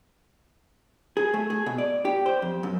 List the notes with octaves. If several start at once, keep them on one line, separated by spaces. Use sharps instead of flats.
G#4
A3
G#4
B2
D5
G4
C5
F2
F#2